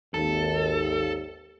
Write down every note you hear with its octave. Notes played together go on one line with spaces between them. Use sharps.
G#1 D#2 A4